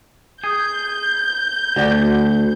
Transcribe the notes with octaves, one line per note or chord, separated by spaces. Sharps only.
G#4 G6
D2 F#4 D5 F#5